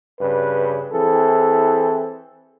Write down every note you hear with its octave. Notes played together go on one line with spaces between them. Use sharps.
G2 C#3 B4
E3 C4 E4 G#4 A4